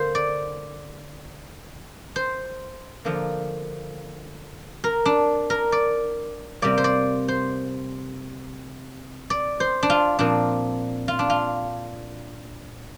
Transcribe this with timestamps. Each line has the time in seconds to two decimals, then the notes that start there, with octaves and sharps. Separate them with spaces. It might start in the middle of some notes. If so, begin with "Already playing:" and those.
Already playing: D3 A#3 A#4 C5
0.15 D5
2.16 C5
3.05 D3 F3 A#3
4.84 A#4
5.06 D4
5.50 A#4
5.72 D5
6.62 C3 G3 A#3 D5
6.78 C5
6.84 D5
7.28 C5
9.30 D5
9.60 C5
9.83 D4
9.90 F4
10.19 A#2 F3 C4 D4
11.08 F4
11.19 D4
11.30 F4